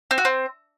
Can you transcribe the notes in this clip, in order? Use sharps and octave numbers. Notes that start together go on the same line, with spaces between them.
C4
F#4
C4